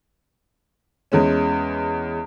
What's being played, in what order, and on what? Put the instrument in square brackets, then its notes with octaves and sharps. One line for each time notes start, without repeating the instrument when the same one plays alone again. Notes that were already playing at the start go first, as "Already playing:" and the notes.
[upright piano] E2 G#3 C#4